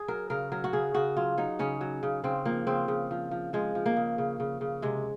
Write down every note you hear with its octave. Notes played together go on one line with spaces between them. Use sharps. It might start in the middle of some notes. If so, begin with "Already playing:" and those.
Already playing: G#4
F#3 A#4
C#3 A#4
F#3 A#4
F#4
C#3 G#4
C#3 F#4
F#3 F4
F#3 D#4
C#3 C#4
F#3
C#3
C#3 C4
F3 A#3
C#3 C4
C#3
F3
F3
F3 G#3
F3
A#3
C#3
C#3
C#3
C#3
C3 G#3